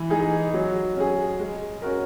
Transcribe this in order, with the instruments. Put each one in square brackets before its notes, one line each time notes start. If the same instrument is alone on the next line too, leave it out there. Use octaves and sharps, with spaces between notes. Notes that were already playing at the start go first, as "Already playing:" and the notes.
Already playing: [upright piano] E3
G#3 D#4 G#4
F#3
C#4 G#4
G#3
C#4 F#4 A#4